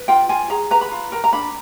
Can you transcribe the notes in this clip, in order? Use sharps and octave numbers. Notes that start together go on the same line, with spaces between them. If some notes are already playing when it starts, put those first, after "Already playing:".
Already playing: B4
F4 G5
F4 G#5
G#4 A#5
B4 A#5
B5
F4
A#4 A#5
A#5
D4 B5